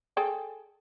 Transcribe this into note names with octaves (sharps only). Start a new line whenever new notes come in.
G#4 A4 G5